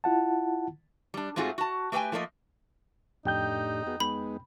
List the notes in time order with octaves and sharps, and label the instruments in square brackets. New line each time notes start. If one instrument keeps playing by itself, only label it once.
[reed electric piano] E4 F4 F#5 A5
[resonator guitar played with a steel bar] G3 D4
G#2 A3 C4 F4 F#4 G#4
F#4 A5
A3 G4 B4 F5 G5 G#5
F3 A3 A#3 C5 D#5
[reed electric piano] F2 G5 G6 [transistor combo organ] A2 D4 G4 [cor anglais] D#4
[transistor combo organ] B3 F#4 G#4
[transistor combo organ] G#3 B3 D#4 [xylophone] B5